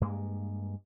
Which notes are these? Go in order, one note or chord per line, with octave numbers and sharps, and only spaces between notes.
G2 G#3 A#3